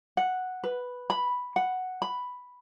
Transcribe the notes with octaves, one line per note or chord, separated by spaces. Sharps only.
F#5
B4
B5
F#5
B5